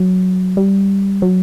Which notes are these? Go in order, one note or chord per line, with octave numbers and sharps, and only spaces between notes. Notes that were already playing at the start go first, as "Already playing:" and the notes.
Already playing: F#3
G3
F#3